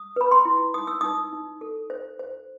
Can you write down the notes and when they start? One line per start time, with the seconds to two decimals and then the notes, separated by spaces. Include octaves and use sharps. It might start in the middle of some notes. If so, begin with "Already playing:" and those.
Already playing: D#6
0.16 B4 B5
0.31 C6
0.45 E4
0.74 D#4 D#6
0.87 E6
1.01 D#4 D#6
1.33 D#4
1.61 A4
1.90 C5
2.19 C5